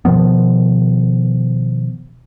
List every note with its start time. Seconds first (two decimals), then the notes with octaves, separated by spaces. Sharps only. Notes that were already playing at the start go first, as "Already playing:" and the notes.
0.05 B2 D#3 F3 B3